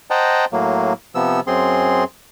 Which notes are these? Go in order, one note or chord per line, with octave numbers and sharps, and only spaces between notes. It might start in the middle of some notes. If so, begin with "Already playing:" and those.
C5 D#5 F#5 G5 A5 A#5
A2 F#3 A#3
C3 F3 B3 E6
F#2 C4 G#4 C6